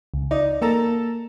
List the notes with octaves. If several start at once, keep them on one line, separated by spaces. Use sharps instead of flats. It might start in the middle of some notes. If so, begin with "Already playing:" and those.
C#2
D#4 D5
A#3 A4 A5 A#5